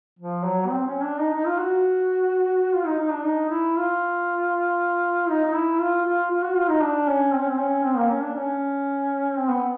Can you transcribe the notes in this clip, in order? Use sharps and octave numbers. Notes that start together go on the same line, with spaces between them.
F3
F#3
C4
C#4
D4
D#4
D#4
F4
F#4
F4
D#4
D#4
D4
D#4
E4
F4
D#4
D#4
E4
F4
F4
F4
F#4
F4
D#4
D4
C#4
C4
C#4
C4
C#4
C4
A#3
C#4
D4
C#4
C4
B3